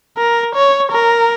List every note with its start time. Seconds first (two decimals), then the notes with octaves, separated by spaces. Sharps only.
0.18 A#4
0.55 C#5
0.92 A#4